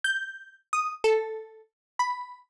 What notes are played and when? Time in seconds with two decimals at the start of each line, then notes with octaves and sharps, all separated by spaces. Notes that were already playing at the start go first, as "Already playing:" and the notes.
0.04 G6
0.73 D#6
1.04 A4
1.99 B5